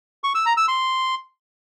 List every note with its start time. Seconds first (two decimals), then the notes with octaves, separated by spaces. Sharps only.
0.24 C#6
0.35 E6
0.46 A#5
0.57 E6
0.68 C6